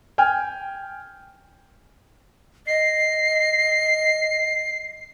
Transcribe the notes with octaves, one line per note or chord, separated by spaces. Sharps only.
G5 G#5 F6
D#5 C7